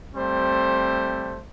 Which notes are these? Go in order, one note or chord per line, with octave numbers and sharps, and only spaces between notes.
G3 A3 C4 C5